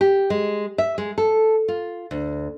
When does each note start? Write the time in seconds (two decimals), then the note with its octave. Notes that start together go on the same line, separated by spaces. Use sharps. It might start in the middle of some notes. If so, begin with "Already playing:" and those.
0.01 G4
0.30 G#3
0.78 E5
0.98 G#3
1.18 A4
1.68 F4
2.11 D2